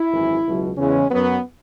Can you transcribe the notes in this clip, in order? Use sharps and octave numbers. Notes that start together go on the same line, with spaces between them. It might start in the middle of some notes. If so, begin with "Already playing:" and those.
Already playing: E4
G#1 F#2 E3
C#2 B2 F#3
E2 C#3 E3 G#3 C#4
F#2 F#3 B3